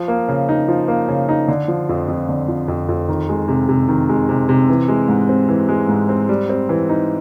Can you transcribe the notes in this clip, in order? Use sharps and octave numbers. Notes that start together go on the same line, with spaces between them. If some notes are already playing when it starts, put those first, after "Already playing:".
Already playing: F3
A#3
C#3
D#4
F3
A#3
C#3
D#4
D3
F3
F2
F2
D3
F3
F2
F2
D#3
G#3
C3
C3
D#3
G#3
C3
C3
E3
G#3
G#2
C4
E3
G#3
G#2
C4
G3
C4
E3
D#4